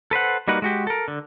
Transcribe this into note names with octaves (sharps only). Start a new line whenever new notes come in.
A4 B4 C5 F#5
G3 A#3 D#4 F#4 B4
G#3 F#4 G4
A4 A#4
D3